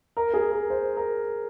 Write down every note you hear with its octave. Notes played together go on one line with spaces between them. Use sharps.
A#4
G#4
A#4
C5
A#4